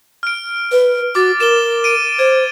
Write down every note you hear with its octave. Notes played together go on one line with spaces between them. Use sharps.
F6 D7
B4
F#4 D6 A6
A#4 E7 G7
D7 D#7
C5 G#6